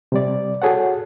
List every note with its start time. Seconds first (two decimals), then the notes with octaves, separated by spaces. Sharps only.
0.12 C3 G3 D5
0.62 F#4 G#4 A4 C#5 F#5